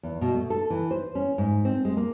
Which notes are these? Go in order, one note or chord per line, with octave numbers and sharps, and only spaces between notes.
E2
B2
A3
A4
E3
C5
C#4
G#2
C4
G#3
A#3